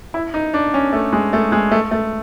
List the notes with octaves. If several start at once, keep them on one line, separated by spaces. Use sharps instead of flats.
E4
D#4
D4
C#4
A3
G#3
A3
G#3
A3
A3